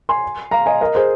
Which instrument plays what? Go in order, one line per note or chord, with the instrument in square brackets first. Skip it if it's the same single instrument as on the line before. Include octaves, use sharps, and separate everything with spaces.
[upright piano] G#5 C6
F5 A#5
D#5 G#5
A#4 D#5
G#4 C5